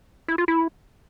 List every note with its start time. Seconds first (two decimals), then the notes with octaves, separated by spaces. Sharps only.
0.28 E4
0.38 F4
0.48 E4